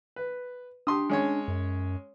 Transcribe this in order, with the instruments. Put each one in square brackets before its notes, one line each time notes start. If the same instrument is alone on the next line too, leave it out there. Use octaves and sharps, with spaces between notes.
[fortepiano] B4
[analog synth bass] D4 [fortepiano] G4 C6 D#6
[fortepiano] G#3 C#4 C#5
[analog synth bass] F#2